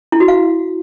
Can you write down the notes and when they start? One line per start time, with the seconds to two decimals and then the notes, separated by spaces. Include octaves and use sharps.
0.12 E4
0.20 F#4
0.28 F5